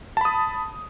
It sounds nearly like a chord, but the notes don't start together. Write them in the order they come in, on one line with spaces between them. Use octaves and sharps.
A5 B5 D#6